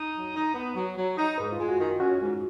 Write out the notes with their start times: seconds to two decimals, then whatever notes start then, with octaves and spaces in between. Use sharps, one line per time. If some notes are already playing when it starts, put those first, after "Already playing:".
Already playing: D#4
0.14 F#3
0.34 D#4
0.54 B3
0.75 F#3
0.97 F#3
1.17 D#4
1.38 G#2 B4
1.52 F4
1.58 G#3
1.69 F#4
1.79 D#3
2.00 C#4 F#4
2.21 G#2